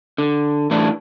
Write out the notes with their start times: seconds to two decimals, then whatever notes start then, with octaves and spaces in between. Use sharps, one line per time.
0.18 D3
0.71 A2 E3 D4